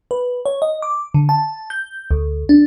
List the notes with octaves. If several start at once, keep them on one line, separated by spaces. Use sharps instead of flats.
B4
C#5
D#5
D6
D3
A5
G6
D2
D4